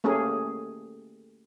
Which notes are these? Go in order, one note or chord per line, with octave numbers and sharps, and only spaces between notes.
A3 A#3 C#4 G4 G#4